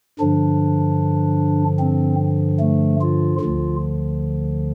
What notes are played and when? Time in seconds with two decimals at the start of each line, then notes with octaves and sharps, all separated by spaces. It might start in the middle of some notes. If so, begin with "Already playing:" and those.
0.19 G2 D3 F3 D4
1.79 C4
2.60 A3
3.01 F4
3.40 D2 D3 F3 F4